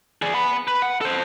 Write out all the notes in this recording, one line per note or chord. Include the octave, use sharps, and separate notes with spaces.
G#4 D5
F#5 B5
B4
F#5
A4 C5